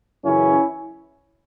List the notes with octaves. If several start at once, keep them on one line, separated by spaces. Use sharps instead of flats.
F#2 C#3 E3 C#4 E4